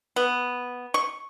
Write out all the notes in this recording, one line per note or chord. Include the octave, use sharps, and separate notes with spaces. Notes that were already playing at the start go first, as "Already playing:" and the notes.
B3
C#6